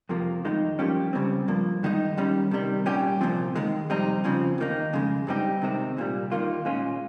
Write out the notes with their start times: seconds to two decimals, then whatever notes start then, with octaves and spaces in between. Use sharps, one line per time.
0.09 F2 C3 F3 A#3
0.45 F2 D#3 G#3 D#4
0.79 G2 F3 A#3 C#4 G4
1.13 C#2 C#3 G3 C4
1.48 G2 F3 A#3
1.83 G2 D#3 G#3 D#4
2.17 D#2 D#3 G3 C#4
2.51 C3 D#3 G3
2.86 A#2 G3 C#4 G4
3.21 C2 A#2 F3 C4
3.55 D#2 D#3 G#3
3.90 F2 C3 G3 C4 D#4
4.24 F2 C#3 F3 C4
4.58 D#2 D#3 A#3 D#4
4.93 F2 C#3 G#3
5.27 G2 G3 C4 D#4 G4
5.62 C3 D#3 G#3 C4
5.97 C2 A#2 G3
6.32 D#2 D#3 A#3 F4
6.65 A#2 G#3 C#4 F4